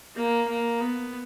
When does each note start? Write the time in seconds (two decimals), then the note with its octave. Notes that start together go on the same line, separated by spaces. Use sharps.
0.16 A#3
0.48 A#3
0.80 B3